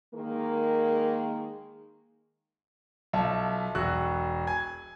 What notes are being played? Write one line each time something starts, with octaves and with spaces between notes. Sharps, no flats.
D#3 G#3 A#3
B1 F4 E5 A5
E1 F#4 C#6 E6 F#6
G#5 G#6